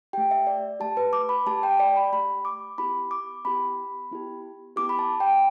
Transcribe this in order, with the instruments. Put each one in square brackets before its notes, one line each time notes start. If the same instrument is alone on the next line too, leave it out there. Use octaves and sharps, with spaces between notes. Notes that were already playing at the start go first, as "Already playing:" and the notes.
[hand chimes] A3 G4 G5
E5
D5
A3 G4 A5
B4
D6
B5
A3 G4 A5
G5
D5
B5
A3 G4 B5
D6
B3 E4 G4 B5
D6
B3 E4 G4 B5
B3 E4 G4
B3 E4 G4 D6
B5
A5
G5